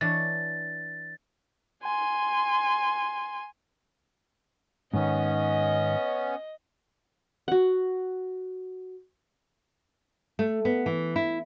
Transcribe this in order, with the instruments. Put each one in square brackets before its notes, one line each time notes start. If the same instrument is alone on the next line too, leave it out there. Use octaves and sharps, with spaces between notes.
[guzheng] E3 D4 C#5 [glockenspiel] A6
[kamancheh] G#5 C6
[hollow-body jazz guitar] G#2 D#3 [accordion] B3 C#4 [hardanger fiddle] D#5
[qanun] F#4 F#5
[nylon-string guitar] A3
B3
E3
E4